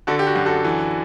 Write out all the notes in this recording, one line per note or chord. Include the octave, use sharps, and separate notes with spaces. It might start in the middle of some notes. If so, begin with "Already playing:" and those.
D3 F#4 A4
G4
F#4
F#2
F#4 A4
E3